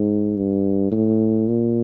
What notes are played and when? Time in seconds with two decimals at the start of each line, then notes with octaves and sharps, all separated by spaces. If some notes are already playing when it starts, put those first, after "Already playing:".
Already playing: G#2
0.37 G2
0.92 A2
1.48 A#2